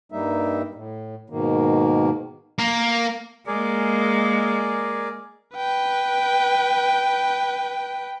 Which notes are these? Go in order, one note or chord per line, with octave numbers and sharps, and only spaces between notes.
G2 G3 A#3 D#4 E5
A2
G#2 B2 D#3 A#3
A#3
G#3 A#3 G#4 A#4 D5
B4 G5